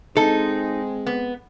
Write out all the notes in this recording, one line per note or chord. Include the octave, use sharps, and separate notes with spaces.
G#3 C4 D#4 A4
B3